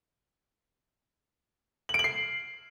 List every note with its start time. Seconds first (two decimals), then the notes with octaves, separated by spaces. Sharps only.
1.89 F#7
1.94 D7
1.99 F#7
2.04 C7